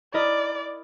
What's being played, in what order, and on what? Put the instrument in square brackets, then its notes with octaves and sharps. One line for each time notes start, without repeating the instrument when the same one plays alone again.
[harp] E4 A#4 D#5 [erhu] D5